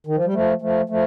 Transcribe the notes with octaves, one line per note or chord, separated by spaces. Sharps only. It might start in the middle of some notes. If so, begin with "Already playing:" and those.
D#3
F3
G3
F3 A3
F3 A3
F3 A3